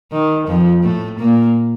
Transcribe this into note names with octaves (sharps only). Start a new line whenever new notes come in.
D#3
F2 F3
A2 A3
A#2 A#3